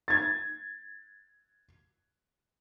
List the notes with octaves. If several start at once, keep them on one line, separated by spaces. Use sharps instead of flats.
G#6 A6